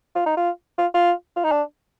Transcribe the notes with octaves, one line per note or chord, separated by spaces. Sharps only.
F4
D#4
F4
F4
F4
F4
D#4
D4